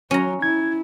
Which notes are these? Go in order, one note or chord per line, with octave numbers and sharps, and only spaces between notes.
F#3 C#4 A#5
E4 G#6